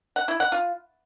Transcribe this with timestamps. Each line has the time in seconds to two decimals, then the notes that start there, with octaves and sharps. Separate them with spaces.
0.16 F#5
0.28 E4
0.40 F#5
0.52 F4